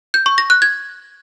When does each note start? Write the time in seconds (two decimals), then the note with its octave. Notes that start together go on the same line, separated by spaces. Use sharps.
0.14 G6
0.26 C#6
0.38 A#6
0.50 F#6
0.62 G#6